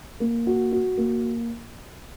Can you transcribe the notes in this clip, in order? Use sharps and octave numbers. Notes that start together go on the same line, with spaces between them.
A#3
F#4
F#4
A#3